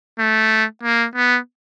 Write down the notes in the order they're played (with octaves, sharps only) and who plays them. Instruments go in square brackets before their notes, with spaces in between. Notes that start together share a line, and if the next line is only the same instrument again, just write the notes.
[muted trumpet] A3
A#3
B3